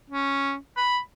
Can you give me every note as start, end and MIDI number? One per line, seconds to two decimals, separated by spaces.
0.10 0.55 61
0.77 0.99 83